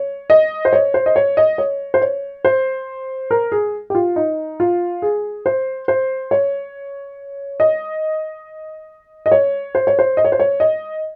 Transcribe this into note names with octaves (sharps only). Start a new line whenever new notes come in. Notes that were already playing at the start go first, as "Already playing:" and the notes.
Already playing: C#5
D#5
C5
C#5
C5
D#5
C#5
D#5
C#5
C5
C#5
C5
A#4
G#4
G4
F4
D#4
F4
G#4
C5
C5
C#5
D#5
D#5
C#5
C5
C#5
C5
D#5
C#5
C5
C#5
D#5